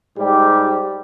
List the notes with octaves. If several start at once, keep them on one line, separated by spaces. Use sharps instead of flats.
G#2 G3 G4